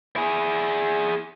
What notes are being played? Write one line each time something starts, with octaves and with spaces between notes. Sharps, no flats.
E4 G#4